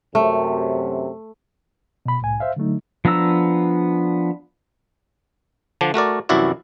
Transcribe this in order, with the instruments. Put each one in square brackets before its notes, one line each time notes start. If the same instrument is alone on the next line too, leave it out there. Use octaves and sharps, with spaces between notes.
[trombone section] F#2 C3 [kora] A3
[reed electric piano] B2 B5
C2 A2 G#5
C5 E5 F5
D3 F#3 A3 D#4
[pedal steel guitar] F3 B3 D4 A#5 E6
[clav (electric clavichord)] D3 F3 D4
A3 F#4 A#4 D5
C2 F#2 E3 E4 F#4 D5